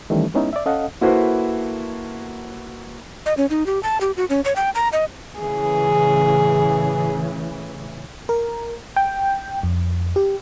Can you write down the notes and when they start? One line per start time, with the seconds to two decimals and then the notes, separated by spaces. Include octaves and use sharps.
0.10 D#3 E3 G3 A3 C#4
0.34 G#3 B3 C#4 D#4 E4
0.53 D5 E5
0.66 C#4 A4 D#5 F5 F#5
1.01 A#3 E4 F#4 A4 B4 C5
3.26 D#5
3.37 C#4
3.50 D#4
3.66 G4
3.83 A5
4.01 G4
4.17 F#4
4.30 C#4
4.45 C#5
4.56 G5
4.75 A#5
4.93 D#5
5.39 A2 C#3 E3 G#4
8.29 A#4
8.96 G5
9.63 F2
10.16 G4